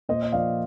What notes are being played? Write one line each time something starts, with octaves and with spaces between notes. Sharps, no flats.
A#2 C5 D#5
D#5
F3 A#3 D5 F5